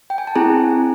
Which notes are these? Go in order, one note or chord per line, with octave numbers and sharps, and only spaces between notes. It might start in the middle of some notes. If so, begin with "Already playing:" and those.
G5
G#5
A5
C4 E4 G#4 G#5 A#5